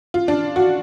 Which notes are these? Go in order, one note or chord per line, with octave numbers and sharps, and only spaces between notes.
F4
D4
F#4